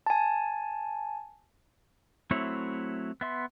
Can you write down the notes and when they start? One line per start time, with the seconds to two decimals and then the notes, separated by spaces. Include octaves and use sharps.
0.06 G#5 A5
2.31 F#3 A3 C4 E4 C#5
3.21 B3 E5 C6